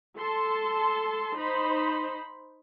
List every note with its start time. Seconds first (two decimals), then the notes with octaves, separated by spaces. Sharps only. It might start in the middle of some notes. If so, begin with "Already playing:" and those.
0.18 A4 A5 C6
1.36 D#4 C5 B5